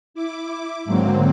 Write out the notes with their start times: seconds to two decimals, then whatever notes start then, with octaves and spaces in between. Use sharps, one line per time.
0.14 E4 D6
0.85 G#2 D3 F#3 A#3 C4